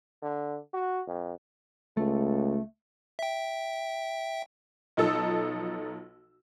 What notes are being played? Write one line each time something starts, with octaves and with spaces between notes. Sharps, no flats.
D3
F#4
F2
C#2 A3
E5 G5
B1 F3 D#4 A4 A5 E6